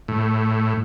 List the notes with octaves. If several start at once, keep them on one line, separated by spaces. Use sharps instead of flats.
A2